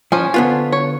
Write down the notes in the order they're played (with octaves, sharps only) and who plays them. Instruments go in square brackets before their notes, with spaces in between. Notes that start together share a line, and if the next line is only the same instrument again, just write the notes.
[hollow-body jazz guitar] F3 [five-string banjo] C#4 C5 G#5
[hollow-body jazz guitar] D3 B3 F4
[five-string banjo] C#5